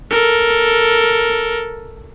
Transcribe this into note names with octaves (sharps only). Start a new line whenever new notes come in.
A4 A#4